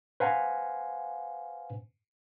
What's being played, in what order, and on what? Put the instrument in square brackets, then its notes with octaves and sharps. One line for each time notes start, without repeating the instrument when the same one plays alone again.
[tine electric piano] B4 C5 F5 F#5 G#5 A#5